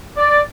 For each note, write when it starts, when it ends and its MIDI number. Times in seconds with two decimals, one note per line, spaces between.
0.16 0.41 74